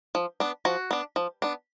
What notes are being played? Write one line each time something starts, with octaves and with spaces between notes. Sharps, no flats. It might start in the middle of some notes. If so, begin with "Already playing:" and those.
F3
B3 D4
F3 F#4
B3 D4
F3
B3 D4